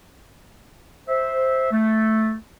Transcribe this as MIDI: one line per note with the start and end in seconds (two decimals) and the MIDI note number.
1.08 1.68 72
1.08 1.68 76
1.72 2.34 57